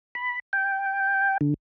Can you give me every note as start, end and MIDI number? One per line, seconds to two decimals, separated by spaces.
0.15 0.40 83
0.53 1.38 79
1.41 1.54 50